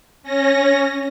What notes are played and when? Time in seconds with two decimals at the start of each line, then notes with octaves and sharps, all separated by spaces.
0.23 C#4 A#6